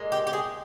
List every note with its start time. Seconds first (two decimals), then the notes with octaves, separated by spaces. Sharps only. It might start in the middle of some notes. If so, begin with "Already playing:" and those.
Already playing: A#2 G#3
0.12 G4
0.27 G4
0.33 G#4